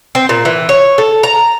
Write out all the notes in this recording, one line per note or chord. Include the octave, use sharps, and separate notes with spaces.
C4
A#2
E3
C#5
A4
A#5